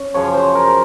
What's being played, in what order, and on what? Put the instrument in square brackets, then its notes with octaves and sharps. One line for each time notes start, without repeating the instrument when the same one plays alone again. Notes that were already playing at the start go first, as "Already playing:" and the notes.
Already playing: [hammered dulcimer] C#4
F#2 C#3 F3 C#5
C5
A#4